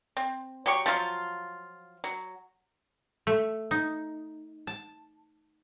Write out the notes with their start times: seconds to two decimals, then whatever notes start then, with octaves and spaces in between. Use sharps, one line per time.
0.17 C4
0.66 F#3 G4 C#6
0.86 F3 F#3 F4
2.04 F#3
3.27 A3
3.71 D#4
4.67 A5